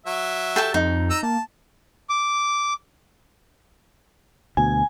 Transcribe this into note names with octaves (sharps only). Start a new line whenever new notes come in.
F#3 E5
A4 G5 A5
F2 D#4
D#5 A#5 E6
A#3 A5
D6
D2 B2 G#5